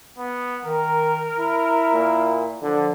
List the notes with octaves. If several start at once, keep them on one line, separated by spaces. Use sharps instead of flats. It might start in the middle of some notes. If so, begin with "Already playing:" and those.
B3
D#3 A#4
E4
A#2
D3 F3